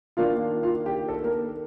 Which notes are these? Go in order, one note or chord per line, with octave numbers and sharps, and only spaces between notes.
D#3 A#3 D4 F4 F5
F4 F5
G4
A4
A#3 A#4